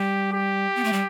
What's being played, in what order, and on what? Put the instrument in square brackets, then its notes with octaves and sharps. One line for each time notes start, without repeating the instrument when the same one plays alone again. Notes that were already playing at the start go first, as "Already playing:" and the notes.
Already playing: [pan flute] G3 [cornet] G4
[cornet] G4
[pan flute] B3
A3
G3